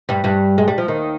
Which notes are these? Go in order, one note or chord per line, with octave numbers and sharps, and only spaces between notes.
G2 G3
G2 G3
G#3
G3
F3
D#2 D#3